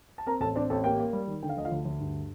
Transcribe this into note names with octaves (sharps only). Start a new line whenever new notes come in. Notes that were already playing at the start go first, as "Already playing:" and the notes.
A5
C4 A#4 A#5
A1 A4 A5
C4 D4 D5
A1 A4 A5
A#3 G4 G5
A#3
G3
D#3
D3 G5
F5
D2 D#5
F4 F5
D2
D2
G2